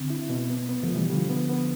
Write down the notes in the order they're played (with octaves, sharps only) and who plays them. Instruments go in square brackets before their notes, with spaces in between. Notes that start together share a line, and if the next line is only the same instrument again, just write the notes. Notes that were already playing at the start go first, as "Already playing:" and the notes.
Already playing: [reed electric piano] D3 [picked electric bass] C4
[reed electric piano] E4
B2
B3
B3
[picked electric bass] F3 A3
[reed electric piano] B2
[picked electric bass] E3 G3
[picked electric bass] D3 F3 [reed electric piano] G3
[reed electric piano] B3
B3